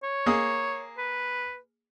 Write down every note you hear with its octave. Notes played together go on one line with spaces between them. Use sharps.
C#5
A#3 G#4 D#6
B4